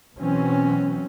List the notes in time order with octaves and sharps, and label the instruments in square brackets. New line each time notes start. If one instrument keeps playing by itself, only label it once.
[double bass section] B2 E3 F#3 C4 C#4